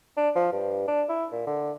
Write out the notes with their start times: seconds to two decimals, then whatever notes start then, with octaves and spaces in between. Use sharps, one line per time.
0.17 D4
0.35 F3
0.52 G2
0.88 D4
1.09 E4
1.32 A#2
1.47 D3